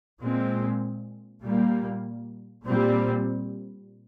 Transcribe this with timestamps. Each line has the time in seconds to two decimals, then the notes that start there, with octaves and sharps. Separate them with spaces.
0.21 A#2 G#3 C4
1.43 A#2 G3 A#3
2.65 A#2 G3 C4